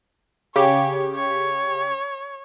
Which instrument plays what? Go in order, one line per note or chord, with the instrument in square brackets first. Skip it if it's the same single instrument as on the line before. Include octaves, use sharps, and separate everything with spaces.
[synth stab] C#3 G4 [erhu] C#5
[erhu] C#5